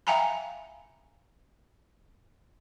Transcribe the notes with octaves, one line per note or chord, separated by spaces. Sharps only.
E5 F5 G5 G#5 A#5 B5